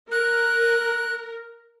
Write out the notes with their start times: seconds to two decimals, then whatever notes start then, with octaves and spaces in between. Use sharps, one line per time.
0.12 A#4 F#6